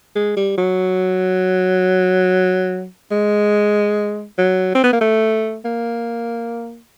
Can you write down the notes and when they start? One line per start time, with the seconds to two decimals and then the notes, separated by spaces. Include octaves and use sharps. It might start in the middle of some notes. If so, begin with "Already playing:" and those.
0.15 G#3
0.37 G3
0.58 F#3
3.11 G#3
4.38 F#3
4.75 C4
4.84 B3
4.93 A#3
5.01 A3
5.65 A#3